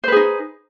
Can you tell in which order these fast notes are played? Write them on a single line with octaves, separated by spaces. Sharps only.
C5 B4 G#4 D#4